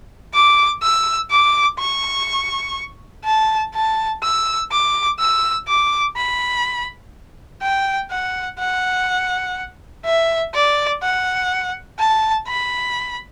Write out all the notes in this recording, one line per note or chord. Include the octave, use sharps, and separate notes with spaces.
D6
E6
D6
C#6
A5
A5
E6
D6
E6
D6
B5
G5
F#5
F#5
E5
D5
F#5
A5
B5